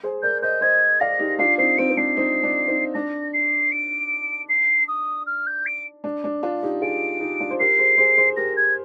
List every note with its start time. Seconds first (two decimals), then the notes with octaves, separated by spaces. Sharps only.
0.03 G#4 C5
0.23 A#4 D5 G6
0.42 C5 D#5 G6
0.61 C5 D#5 G#6
1.00 D5 F5 A#6
1.19 D#4 G4
1.39 D4 F4 C7
1.58 C4 D#4 C7
1.78 C4 D#4 D7
1.90 C4
1.97 D4 C7
2.17 C4 D#4
2.43 D4
2.68 C4 D#4
2.94 D4 A#6
3.33 C7
3.72 D7
4.49 C7
4.88 D#6
5.26 F6
5.47 G6
5.66 D7
6.04 D4
6.24 D4
6.43 D4 F4
6.63 D#4 G4
6.82 F4 G#4 D7
7.20 D#4 G4
7.40 D4 F4
7.51 C5
7.60 G4 A#4 C7
7.78 G#4 C5
7.98 G#4 C5
8.17 G#4 C5
8.36 G4 A#4 A#6
8.57 G#6